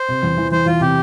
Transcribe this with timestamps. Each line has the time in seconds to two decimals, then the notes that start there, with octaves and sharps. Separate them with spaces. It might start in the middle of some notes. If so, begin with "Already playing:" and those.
Already playing: C5
0.08 C3
0.23 E2
0.38 E3
0.52 E3 C5
0.66 E2 F4
0.81 C3 G4